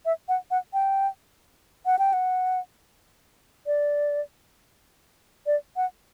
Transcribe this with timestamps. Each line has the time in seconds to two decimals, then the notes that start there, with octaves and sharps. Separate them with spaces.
0.06 E5
0.29 F#5
0.51 F#5
0.73 G5
1.86 F#5
1.99 G5
2.13 F#5
3.67 D5
5.46 D5
5.76 F#5